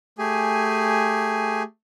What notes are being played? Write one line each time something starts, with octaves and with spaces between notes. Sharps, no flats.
A3 G4 G#4 G#5